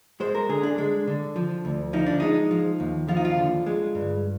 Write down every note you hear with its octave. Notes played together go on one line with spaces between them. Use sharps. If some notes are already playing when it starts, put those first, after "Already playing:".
G#3 C5
A#4
D3 G#4
D4
G#3
D3
F3
D2
F3 D#4
D4
G#3 D#4
F3
D#2
F3 F4
D#4
F4
D3
G#3
G2